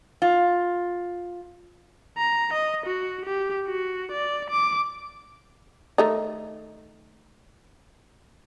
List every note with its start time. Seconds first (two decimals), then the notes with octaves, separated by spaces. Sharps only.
0.22 F4
2.18 A#5
2.53 D#5
2.86 F#4
3.25 G4
3.67 F#4
4.11 D5
4.50 D6
5.98 D#3 A3 D#4